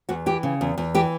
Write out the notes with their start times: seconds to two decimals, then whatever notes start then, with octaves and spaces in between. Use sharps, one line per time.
0.09 E2 F#4
0.26 E3 G4
0.43 C#3
0.61 E2
0.78 E2
0.95 E3 G4